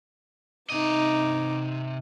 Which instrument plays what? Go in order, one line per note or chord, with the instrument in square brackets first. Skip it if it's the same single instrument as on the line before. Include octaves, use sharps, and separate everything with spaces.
[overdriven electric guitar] C3 D#5 [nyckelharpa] D#4 D6